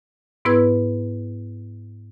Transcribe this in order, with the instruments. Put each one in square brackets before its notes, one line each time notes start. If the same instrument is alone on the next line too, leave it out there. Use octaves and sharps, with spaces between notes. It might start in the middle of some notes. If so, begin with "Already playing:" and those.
[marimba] G#2 B3 E4 B4 E6 G#6